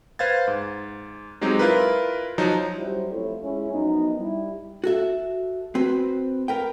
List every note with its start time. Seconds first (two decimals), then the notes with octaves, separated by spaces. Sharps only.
0.19 B4 C5 F5 G#6 A6
0.47 G#2
1.41 F#3 G#3 C4 D#4 G4
1.59 E4 F4 A#4 B4
2.38 F3 F#3 D#4
2.77 F#3 G3 C#4 E4 G4 C5
3.11 F2 A3 E4 F4 A4 C#5
3.42 G#3 C#4 E4
3.72 F#2 F3 B3 D#4
4.19 G3 E4
4.84 F#4 A4 E5
5.75 C4 F#4 B4
6.48 A#4 B4 G5